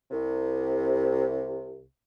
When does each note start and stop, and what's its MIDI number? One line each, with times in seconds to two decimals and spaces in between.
0.11 1.82 36
0.11 1.82 48